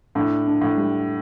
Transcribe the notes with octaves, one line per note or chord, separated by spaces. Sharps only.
A2 D4
D4
A2
G3